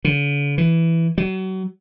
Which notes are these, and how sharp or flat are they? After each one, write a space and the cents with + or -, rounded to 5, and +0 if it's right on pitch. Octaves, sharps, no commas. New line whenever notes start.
D3 -45
E3 +5
F#3 +30